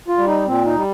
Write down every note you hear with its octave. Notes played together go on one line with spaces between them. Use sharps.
F4
G3
D#4
A#2 C4
D#4
G3